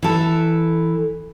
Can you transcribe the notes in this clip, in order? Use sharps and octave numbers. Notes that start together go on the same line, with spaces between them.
E3 A4